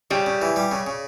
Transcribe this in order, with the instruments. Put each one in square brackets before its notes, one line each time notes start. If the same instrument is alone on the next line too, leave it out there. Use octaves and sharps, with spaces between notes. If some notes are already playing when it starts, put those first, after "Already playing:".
[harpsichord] C#3 [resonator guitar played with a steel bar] G3
[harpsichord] C#3
E3
G3
C#3
C#3